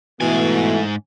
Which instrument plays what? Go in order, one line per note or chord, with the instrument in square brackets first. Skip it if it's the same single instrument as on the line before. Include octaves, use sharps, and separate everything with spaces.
[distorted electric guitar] G#2 G#5 [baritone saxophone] B2 [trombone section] E3 A3